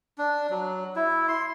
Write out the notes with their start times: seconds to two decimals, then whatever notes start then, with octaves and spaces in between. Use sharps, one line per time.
0.18 D4
0.50 F#3
0.96 E4
1.28 C6